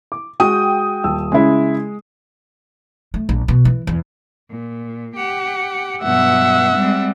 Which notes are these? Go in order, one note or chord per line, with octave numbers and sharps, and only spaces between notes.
D6
G#3 F#4 G5 D#6
D#1 A5 E6
C#3 G#3 E4
A3
A#1
B2
E3
E2
A#2
G4 F#5
G2 B2 F#3 E5 F#5
G3 G#3 C4